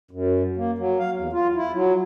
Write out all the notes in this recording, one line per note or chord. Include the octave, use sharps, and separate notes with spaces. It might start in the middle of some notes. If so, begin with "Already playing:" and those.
F#2
A#3
F#3
F5
E2
F4
E4
F#3